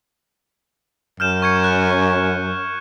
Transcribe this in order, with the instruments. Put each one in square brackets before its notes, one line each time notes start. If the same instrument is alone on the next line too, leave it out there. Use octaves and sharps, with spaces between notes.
[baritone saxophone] F#2 [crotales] F6 G6 E7
[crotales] C#6 G#6 C#7
F#6